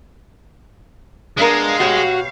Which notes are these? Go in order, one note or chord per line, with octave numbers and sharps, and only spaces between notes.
G#3 B3 D4 A#4 F5
B2 F#4 G4 C#5